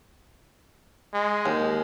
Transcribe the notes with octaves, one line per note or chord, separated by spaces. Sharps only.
G#3
D#2